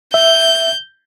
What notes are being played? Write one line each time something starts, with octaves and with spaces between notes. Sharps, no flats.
E5 G6